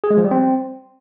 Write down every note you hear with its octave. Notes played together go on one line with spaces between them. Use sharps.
G#4
G#3
F3
G3
C4